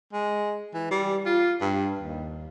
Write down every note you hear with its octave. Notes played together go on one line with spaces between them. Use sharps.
G#3
E3
G3
F4
G2
D#2